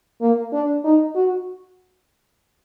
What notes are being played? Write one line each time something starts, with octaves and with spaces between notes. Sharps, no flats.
A#3
D4
D#4
F#4